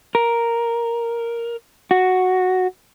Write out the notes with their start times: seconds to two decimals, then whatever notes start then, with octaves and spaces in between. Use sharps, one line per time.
0.15 A#4
1.91 F#4